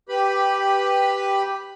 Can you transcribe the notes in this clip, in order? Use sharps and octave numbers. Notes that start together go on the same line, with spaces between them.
G4 B4 B5